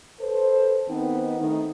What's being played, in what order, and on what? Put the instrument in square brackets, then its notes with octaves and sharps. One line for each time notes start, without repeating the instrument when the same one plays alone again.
[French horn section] A4 B4 C5
D#3 B3 C4 D#4
D#3 A3 D#4